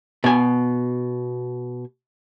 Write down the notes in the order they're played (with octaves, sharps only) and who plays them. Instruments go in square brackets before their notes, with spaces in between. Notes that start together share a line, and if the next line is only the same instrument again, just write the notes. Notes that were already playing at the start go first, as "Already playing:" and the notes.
[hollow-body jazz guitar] B2 G#5